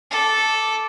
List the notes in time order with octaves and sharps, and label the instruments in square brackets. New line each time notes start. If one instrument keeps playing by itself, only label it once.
[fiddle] A4 D6